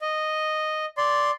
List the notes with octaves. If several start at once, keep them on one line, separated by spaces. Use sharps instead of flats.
D#5
D5 C6